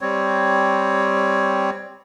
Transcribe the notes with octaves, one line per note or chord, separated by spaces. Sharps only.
G3 C4 C#5